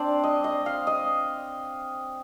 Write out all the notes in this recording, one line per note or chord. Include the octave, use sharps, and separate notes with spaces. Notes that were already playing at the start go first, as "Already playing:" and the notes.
Already playing: C4 D4 C5 D5
D#5
D#5
F5
D#5